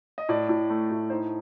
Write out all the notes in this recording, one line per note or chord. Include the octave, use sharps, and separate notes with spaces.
D#5
A2 D5
A2
A3
A2
D#4 C5